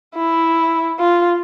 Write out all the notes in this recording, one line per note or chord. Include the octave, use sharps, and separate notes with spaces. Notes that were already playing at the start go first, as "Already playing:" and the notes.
E4
F4